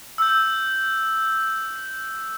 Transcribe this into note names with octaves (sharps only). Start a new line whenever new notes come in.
E6 G6